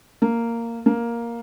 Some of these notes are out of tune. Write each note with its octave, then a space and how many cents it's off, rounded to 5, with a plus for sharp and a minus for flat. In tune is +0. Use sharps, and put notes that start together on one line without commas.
A#3 -10
A#3 +5